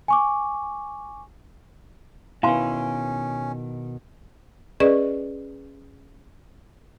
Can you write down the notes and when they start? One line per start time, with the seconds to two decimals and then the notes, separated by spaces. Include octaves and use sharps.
0.08 G#5 C#6 D6
2.43 B2 D#3 B3 C#4 E4 F5 G#5 C6
4.80 C#4 G#4 B4 D5 D#5 C#6